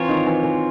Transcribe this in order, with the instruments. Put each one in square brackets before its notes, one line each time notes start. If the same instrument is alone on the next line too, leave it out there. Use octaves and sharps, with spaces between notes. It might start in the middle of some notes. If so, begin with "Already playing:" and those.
Already playing: [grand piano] E3 [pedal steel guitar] C4 F4 A#4 C#5
[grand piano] D#3
E3
E3